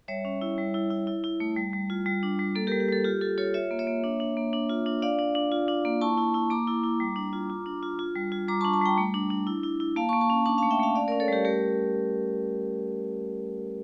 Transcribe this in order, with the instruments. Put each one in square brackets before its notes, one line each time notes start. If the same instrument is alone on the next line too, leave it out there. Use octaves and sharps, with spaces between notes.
[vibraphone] G3 C#5 E5
C#4
E4
G3
E4
E4
E4
E4
A3
G3
G3
F4
G3
D4
G3
A#3 A4
G4 A#4
G3
G4
G3 A4
F4 G4
F4 A4
F4 A4 C#5
F4 C#5 E5
A#3
C#5 E5
A#3
D4
D4
A#3
D4
F4
D4
D4 D5 F5
D4
D4
F4
D4
A#3
E4 A5 C#6
E4
E4
A#3 A#5 D6
E4
E4
G3
D4
F4
F4
D4
F4
F4
G3
F4
G3 A#5 D6
A5 C#6
D4
A5 C#6
G3 G5 A#5
A3
D4
D4
E4
E4
E4
A#3 F5 A5
A5 C#6
A#3
A5 C#6
C#4
D4 A5 C#6
F5 A5
A3
E5 G5
A3 F5 A5
C#4 D5 F5
A#4 D5
C#4
A4 C#5
G3 G4 A#4
A3 G4 A#4